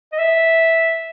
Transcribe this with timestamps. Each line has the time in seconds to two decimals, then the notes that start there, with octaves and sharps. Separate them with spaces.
0.12 D#5
0.18 E5